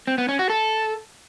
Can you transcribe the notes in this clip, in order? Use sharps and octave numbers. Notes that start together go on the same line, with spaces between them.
C4
B3
C#4
F#4
A4